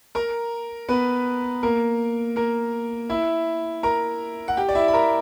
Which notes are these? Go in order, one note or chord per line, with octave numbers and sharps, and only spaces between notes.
A#4 A#5
B3 B4
A#3 A#4
A#3 A#4
E4 E5
A#4 A#5
F#5
G4 G5
D5
E4 E5
B5
A#4 A#5